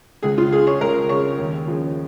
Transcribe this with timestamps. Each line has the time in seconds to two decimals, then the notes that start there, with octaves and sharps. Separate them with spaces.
0.23 C#2 G#4
0.38 F4
0.52 C#3 G#3 G#4
0.67 C#5
0.80 C#2 A#4
1.09 C#3 G#3 C#5
1.38 D#2
1.67 C#3 F3 G#3